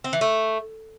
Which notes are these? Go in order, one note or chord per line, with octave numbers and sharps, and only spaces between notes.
C4
E3
A3